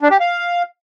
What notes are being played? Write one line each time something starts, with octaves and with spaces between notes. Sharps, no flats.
D4
G4
F5